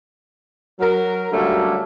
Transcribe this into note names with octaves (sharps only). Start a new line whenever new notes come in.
F#3 A#4
D3 F#3 G3 A3 A#3 C#4